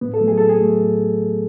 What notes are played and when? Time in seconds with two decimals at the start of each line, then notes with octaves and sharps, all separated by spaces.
0.01 A2 B3
0.14 A4
0.20 F#3 A3
0.28 G#4
0.38 A2 A4
0.49 G#4
0.59 F#3 A3
0.79 A2